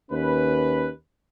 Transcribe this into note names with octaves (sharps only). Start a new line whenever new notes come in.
D#2 C#4 B4